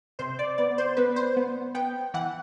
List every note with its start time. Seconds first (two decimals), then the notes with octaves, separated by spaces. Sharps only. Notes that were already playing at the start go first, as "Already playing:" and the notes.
0.19 C3 C5
0.39 D5
0.58 B3 D5
0.78 C5
0.97 B3 B4
1.16 C5
1.37 B3
1.75 B3 G5
2.14 E3 F#5